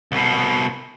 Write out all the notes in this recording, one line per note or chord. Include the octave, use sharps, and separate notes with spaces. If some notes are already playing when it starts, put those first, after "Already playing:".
C2 B2